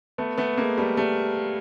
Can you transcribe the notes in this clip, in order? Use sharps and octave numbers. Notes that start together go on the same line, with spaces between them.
A3 B3
A3 B3
G#3 A#3
G3 A3
G3 A3